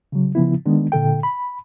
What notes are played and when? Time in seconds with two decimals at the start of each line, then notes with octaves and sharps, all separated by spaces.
0.12 C#3 F#3
0.35 C#3 F3 B3 E4
0.66 D#3 G#3 B3 D4
0.92 A#2 D3 A4 G5
1.23 B5